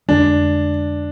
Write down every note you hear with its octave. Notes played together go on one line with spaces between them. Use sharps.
F2 D3 G#3 D4